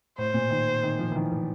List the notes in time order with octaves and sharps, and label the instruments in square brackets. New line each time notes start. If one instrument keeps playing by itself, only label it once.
[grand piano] A2 [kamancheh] C5
[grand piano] A#2
D#3
D#3
F3
E3
D#3
E3